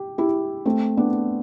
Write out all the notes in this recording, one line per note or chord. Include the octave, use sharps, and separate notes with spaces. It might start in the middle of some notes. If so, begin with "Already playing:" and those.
Already playing: G4
E4 G4
A3 C4
B3 D4